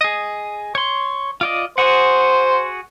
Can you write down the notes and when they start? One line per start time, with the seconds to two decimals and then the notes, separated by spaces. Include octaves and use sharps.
0.01 G#4 D#5
0.75 C#5 C6
1.41 F4 D5 D#5
1.78 F#4 G#4 C5 F#5